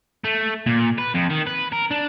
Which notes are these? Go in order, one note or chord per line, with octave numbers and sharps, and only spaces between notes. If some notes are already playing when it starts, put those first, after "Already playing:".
A3
A#2
B4
F2
D#3
B4
A#4
D4